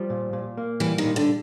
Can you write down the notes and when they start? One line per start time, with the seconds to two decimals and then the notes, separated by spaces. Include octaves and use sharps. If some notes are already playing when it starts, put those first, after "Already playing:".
Already playing: F3 G3
0.10 A#2
0.33 A#2
0.57 A#3
0.80 E3 G3
0.98 D#3
1.05 A#2
1.16 D3